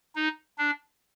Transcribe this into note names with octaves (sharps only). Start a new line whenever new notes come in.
D#4
D4